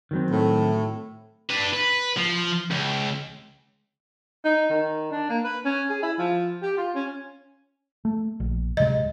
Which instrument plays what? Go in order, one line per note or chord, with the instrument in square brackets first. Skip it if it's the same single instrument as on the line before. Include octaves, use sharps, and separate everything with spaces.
[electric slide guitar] D#3 F#3 C4
[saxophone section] A2
[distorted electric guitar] D4 B4
B4
F3
C#2
[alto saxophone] D#4
D#3
D4
A#3
B4
C#4
G#4
E4
F3
G4
F4
C#4
[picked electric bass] A3
A#1
[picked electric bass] D1 C3 G#3 [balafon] D#5